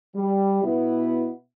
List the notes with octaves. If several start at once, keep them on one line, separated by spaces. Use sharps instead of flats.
G3
B2 B3 E4